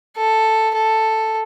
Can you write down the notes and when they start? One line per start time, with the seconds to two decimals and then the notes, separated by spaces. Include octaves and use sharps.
0.17 A4
0.75 A4